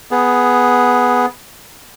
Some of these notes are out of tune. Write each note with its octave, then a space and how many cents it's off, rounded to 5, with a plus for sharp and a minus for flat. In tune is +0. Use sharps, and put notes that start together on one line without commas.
B3 +0 G#4 +0